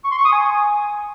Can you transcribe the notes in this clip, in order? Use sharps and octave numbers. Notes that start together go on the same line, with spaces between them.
C#6
C6
C#6
D#6
G#5